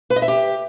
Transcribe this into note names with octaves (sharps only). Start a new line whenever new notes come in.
B4
D#5
E5
G4